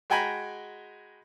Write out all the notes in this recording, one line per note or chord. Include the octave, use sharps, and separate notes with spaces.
G#3 F#4 G5 G#5 A#5 B5